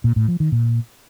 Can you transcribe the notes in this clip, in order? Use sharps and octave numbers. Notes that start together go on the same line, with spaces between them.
A#2
A2
F3
D#3
A#2